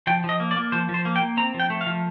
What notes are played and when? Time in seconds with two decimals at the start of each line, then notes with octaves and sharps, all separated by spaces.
0.07 F3 G5
0.24 F3
0.29 D#5
0.40 A#3
0.51 D5
0.56 A#3
0.72 F3 C5
0.89 F3
0.94 C5
1.05 A#3
1.16 G5
1.21 A#3
1.37 C4 A#5
1.54 F3
1.60 G5
1.70 A3
1.81 F5
1.87 F3